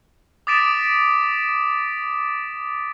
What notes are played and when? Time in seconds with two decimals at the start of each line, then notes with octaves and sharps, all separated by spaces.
0.47 D6 D#6 A6 B6 D7 E7